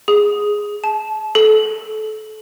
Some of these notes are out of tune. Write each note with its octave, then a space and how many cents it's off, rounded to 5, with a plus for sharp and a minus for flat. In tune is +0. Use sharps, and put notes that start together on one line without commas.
G#4 +0
A5 -30
A4 -25